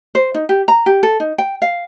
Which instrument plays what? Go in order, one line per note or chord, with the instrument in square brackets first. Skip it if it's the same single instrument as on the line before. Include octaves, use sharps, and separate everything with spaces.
[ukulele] C5
D#4
G4
A#5
G4
A4
D#4
G5
F5